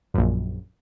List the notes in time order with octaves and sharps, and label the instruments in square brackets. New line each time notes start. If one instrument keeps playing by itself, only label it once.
[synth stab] A#1 F#2